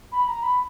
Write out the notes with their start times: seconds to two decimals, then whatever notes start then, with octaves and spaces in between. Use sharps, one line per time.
0.12 B5
0.28 A#5
0.43 B5